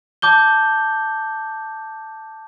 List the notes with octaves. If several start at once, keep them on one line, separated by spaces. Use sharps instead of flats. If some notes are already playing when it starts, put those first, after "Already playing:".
A5 D6 G6 G7